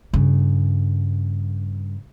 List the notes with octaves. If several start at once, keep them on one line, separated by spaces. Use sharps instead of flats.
G2 C#3